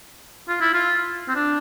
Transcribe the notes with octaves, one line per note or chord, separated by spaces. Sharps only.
F4
E4
F4
C4
D4